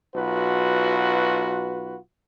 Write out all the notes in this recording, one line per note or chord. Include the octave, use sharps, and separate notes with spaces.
B1 F4 F#4 B4